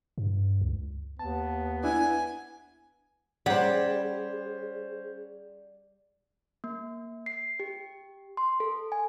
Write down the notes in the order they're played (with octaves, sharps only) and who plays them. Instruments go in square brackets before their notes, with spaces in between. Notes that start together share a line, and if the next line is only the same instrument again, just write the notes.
[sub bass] G2
C#2
[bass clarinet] D#2 [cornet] B3 [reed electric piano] A5
[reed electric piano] D4 E4 [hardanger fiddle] G#5
[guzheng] G3 [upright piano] C#4 C5 [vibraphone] G#4 [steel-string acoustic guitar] D5 F#5
[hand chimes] A#3
C7
G4
C6
A4
G#5